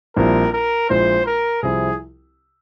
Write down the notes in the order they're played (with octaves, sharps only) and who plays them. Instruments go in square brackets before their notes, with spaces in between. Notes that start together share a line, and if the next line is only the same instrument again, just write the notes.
[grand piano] A#1 A#2 G3 C4 E4 [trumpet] A#4
[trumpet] A#4
[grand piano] A#1 A#2 G#3 E4 [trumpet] C5
[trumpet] A#4
[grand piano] C2 C3 F3 C4 E4 [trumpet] G#4